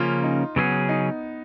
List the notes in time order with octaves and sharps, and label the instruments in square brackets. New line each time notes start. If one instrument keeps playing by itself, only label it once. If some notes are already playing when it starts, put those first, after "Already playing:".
Already playing: [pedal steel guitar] C#3 F3 A#3 C#4 [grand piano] F4
[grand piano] D#4
[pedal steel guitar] C#3 F#3 C#4 G#4 [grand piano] B3
[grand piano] D#4